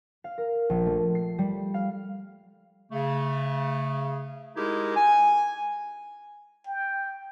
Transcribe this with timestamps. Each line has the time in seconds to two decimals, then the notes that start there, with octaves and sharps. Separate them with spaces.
0.24 F5
0.38 A#4
0.70 A#1
0.86 A3
1.15 C7
1.39 G3
1.74 F5
2.92 C#3 A3
4.56 G#3 D#4 E4 G4 G#4 A#4
4.96 G#5
6.66 G5